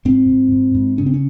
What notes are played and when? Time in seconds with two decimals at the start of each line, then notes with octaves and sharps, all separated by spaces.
0.05 G#2 C4
0.29 G#2
0.52 G#2
0.75 G#2
0.98 C#3 C#4
1.06 C4
1.14 C#4